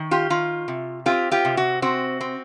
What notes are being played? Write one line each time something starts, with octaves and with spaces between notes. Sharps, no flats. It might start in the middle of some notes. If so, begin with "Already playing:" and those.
Already playing: D#3
F4 G4
D#3 F4
C3
C4 F4 G4
F4 G4
C3
F#4
C4 F#4
C4